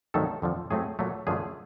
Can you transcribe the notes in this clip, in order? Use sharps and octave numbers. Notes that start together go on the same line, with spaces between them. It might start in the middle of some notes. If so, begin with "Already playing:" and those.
G2 D#3 F#3 A3 C4 A4
F2 D3 F3
A2 F#3 A3 C4 G#4
A#2 F#3 A3
F#2 D3 F3 A3 G#4